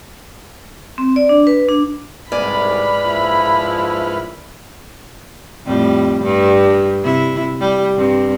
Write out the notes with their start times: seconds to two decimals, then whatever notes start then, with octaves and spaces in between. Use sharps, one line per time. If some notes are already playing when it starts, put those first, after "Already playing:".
0.98 C4
1.16 D5
1.29 D4
1.47 B4
1.69 D4
2.32 C2 G#2 B4 D5 G#5 B5 F6
3.03 A#1 F3 E4
5.66 F2 A2 G3
6.23 G2
7.02 C3 E4
7.60 G3
7.96 G2 C4